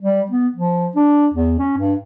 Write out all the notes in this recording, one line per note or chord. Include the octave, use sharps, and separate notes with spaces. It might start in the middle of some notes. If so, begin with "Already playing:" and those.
G3
B3
F3
D4
E2
C#4
G2